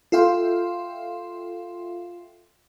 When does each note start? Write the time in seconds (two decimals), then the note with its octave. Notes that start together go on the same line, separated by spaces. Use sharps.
0.12 F4 A4 E5 F5 G5 C6